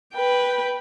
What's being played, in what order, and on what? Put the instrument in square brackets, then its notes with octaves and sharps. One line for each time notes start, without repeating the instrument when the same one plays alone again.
[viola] B4 G5